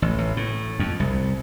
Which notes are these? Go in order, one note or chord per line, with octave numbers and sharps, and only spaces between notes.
A1
A1
A2
F2
C2